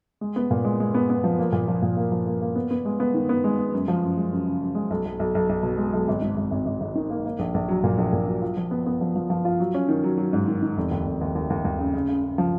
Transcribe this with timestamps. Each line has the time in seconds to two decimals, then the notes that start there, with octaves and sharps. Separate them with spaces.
0.21 G#3
0.36 B3
0.51 A#2
0.65 G#3
0.80 G#3
0.94 B3
1.10 B3
1.24 F3
1.39 A#3
1.52 A#2
1.68 F3
1.82 A#2
1.97 A#3
2.12 F3
2.26 A#3
2.42 A#3
2.55 B3
2.71 B3
2.85 G#3
3.00 B3
3.14 D#3
3.29 B3
3.44 G#3
3.59 G#3
3.72 F#2
3.88 F3
4.03 F#2
4.17 G#3
4.32 F#2
4.46 C#3
4.62 F#2
4.75 G#3
4.90 B1
5.05 B1
5.19 B1
5.35 B1
5.49 B1
5.63 B2
5.78 G#3
5.93 B1
6.08 G#1
6.22 G#2
6.37 G#1
6.51 G#1
6.66 G#1
6.81 G#1
6.95 D#3
7.10 A#3
7.25 A#3
7.39 A#1
7.54 A#1
7.68 F#3
7.84 A#2
7.98 A#1
8.13 A#2
8.27 F#3
8.42 F4
8.57 F3
8.71 B3
8.86 B3
9.01 F3
9.16 F3
9.30 F3
9.45 F4
9.60 F#3
9.74 C#4
9.89 D#3
10.03 F#3
10.18 F#3
10.33 G#2
10.48 D#3
10.62 D#3
10.77 F1
10.91 D#2
11.07 F1
11.21 D#2
11.35 D#2
11.50 D#2
11.65 D#2
11.79 C#3
11.94 C#3
12.08 C#3
12.24 C#3
12.38 F3